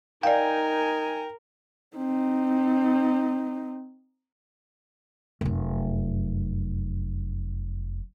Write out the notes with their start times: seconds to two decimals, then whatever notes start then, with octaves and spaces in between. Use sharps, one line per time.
0.23 D#4 A#4 D5 F5 G5 G#5
1.97 C4 D#4
5.41 F1 F#2